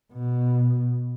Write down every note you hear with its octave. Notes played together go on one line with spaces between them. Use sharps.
B2